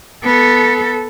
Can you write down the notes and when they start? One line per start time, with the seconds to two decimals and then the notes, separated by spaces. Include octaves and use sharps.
0.24 B3 A4